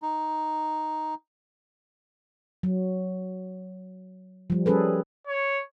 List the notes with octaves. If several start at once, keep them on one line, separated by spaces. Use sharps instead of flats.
D#4
F#3
F3 G3
G3 C#4 G#4 A4 B4
C#5